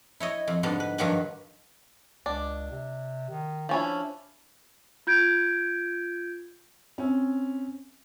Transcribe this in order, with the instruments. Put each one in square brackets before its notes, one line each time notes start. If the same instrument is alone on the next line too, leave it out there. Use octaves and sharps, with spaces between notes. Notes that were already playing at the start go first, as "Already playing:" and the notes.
[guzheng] E4 C#5 D#5
F2
G#2 D3 G3 B3
B4
G2 D#3 F3 F#3 G4 B4
[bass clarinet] C#2 [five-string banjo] D4
[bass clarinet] C3
D#3
[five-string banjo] F3 C#4 E4 [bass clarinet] D4
[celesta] F4 G6 G#6 D7
[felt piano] C4 C#4